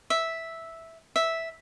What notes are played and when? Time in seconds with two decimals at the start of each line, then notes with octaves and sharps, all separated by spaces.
0.10 E5
1.16 E5